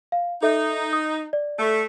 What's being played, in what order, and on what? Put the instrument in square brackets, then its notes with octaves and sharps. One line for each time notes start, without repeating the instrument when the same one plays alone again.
[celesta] F5
[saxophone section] D#4 [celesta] A4 E5
[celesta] D#6
D5
[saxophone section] A3